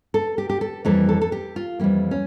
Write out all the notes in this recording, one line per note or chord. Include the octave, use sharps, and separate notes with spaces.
A4
G4
G4
A4
F2 E3 G3 A#3 A4
A4
A4
G4
F4
F2 E3 G3 A#3
C#4